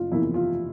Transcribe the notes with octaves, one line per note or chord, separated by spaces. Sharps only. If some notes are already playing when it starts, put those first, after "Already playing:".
Already playing: F#1 F4
E2 C3 F3 A#3 E4
F4